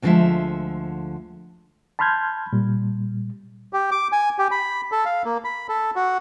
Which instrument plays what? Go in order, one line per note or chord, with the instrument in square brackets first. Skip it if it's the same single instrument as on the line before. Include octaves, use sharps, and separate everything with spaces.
[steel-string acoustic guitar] D2 B2 D3 F3 G#3 E5
[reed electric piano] A5 B5 C6 F6 G6 G#6
A#2 G3
[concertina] G4
D6
G#5
G4
B5
A4
F5
A#3
B5
A4
F#4